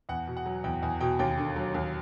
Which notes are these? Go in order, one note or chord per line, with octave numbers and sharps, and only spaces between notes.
E2 F#5
B2
F#5
F#3
E2 G5
E2 G#5
B2 G5
D#2 G5
D3
F#3
D#2